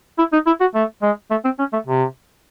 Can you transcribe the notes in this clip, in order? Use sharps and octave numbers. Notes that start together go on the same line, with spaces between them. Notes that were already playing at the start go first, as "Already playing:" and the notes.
E4
D#4
E4
F#4
A3
G#3
A3
C4
C#4
A3
C3